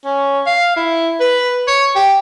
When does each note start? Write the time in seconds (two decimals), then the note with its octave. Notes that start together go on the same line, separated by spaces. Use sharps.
0.05 C#4
0.46 F5
0.76 E4
1.20 B4
1.67 C#5
1.95 G4